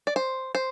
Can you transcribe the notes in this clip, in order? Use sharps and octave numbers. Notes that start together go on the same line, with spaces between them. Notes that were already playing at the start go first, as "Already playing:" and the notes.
D5
C5
C5